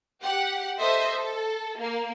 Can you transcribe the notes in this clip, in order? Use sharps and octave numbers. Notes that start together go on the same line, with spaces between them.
G4 F#5
A4 C5 D#5 E5
A4
A#3